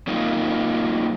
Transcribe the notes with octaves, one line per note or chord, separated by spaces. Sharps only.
F#3 A#3 C4 D#4 F4